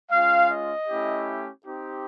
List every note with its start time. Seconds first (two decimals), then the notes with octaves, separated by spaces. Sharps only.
0.11 G#3 C#4 F4 F5
0.50 D#5
0.88 A3 C#4 E4 G4
1.66 C4 D#4 G4